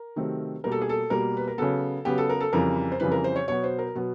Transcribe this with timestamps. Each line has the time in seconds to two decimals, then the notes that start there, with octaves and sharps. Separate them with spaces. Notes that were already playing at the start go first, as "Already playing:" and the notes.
Already playing: A#4
0.16 C3 D#3 F#3 A3 C4
0.64 B2 G3 A#3 A#4
0.72 A4
0.82 G#4
0.89 A4
1.10 B2 G3 A#3 A#4
1.37 B4
1.47 A#4
1.58 C#3 F#3 B3 A4
2.05 C#3 F#3 B3 G4
2.18 A4
2.29 A#4
2.40 A4
2.53 F2 C#3 E3 G3 A#4
2.92 C5
3.00 F2 C#3 E3 G3 B4
3.12 A#4
3.24 C5
3.36 C#5
3.48 B2 F#3 B3 C#5
3.64 C5
3.79 A#4
3.95 B2 F#3 B3